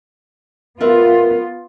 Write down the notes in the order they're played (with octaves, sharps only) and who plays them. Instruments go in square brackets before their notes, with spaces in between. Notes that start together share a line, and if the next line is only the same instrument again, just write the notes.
[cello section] B3 F4 [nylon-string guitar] A#4 B4 E5